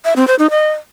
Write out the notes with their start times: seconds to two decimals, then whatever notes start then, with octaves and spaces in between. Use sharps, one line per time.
0.05 E5
0.16 C4
0.28 C5
0.39 D#4
0.50 D#5